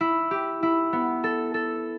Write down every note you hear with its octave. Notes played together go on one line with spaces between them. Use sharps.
E4
G4
E4
B3
A4
A4